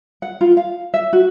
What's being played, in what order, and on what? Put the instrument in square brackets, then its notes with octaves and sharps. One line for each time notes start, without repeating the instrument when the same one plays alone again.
[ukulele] F#5
F4
F5
E5
F#4